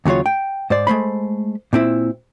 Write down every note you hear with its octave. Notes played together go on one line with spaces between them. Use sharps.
D#2 C#3 F#3 F4 C#5
G5
G#2 C5 D5
G#3 A3 C5 B5
A#2 C4 E4